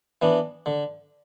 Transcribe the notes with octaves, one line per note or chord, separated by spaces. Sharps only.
E3 B3 D4
D3